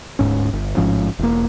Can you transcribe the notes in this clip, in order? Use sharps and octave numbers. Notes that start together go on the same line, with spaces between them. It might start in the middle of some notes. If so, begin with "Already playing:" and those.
D1 G#2 C#4
G1
A1 G#2 F3 C#4
E1 A#3